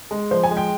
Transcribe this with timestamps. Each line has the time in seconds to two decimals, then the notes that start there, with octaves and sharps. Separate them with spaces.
0.11 G#3
0.31 F3 C5
0.44 G#5
0.51 G#3
0.57 G5